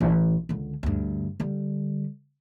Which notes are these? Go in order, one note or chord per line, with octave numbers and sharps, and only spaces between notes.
A1
C#2 D3
D2 G2
D3 G3